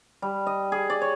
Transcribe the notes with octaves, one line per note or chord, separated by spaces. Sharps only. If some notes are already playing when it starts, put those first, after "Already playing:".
G3
D#5
G#4
D5
C#5